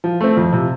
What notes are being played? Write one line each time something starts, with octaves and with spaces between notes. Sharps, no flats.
F3
A3 C4
F2
C3 F3